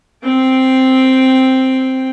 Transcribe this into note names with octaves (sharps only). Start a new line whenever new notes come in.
C4 G5